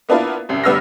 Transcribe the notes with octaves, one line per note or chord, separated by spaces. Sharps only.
A#3 B3 D4 E4 F4
C2 F#2 C3
G1 G3 B3 E6 F6 A#6